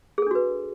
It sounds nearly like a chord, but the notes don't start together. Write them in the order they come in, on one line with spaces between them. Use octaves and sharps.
G#4 A4 D4 F#4 B4